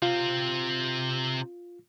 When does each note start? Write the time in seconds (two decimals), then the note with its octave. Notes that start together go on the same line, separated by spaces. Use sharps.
0.02 C3 C4 F4